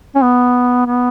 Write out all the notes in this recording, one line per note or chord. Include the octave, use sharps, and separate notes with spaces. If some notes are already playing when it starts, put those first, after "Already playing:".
C#4
B3
B3